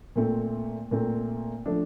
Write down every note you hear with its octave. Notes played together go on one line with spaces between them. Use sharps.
A#2 A3 C4
A#2 A3 C4
F3 A3 D4